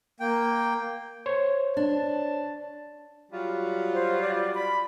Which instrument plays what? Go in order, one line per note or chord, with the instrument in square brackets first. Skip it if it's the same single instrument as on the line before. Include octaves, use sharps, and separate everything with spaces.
[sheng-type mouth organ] A#3 G5
[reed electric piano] C5 C#5
[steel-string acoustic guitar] D4 [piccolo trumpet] A5
[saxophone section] F#3 G3 F4
[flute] C5
D5
B5